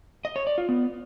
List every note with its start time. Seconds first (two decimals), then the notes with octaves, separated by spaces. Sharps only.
0.25 D#5
0.36 C#5
0.47 D5
0.58 F4
0.69 B3